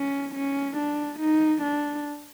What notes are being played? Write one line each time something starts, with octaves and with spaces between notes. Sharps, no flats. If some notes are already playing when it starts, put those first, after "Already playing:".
Already playing: C#4
C#4
D4
D#4
D4